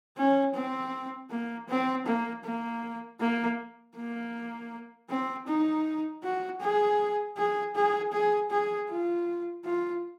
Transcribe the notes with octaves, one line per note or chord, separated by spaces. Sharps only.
C#4
C4
A#3
C4
A#3
A#3
A#3
A#3
C4
D#4
F#4
G#4
G#4
G#4
G#4
G#4
F4
F4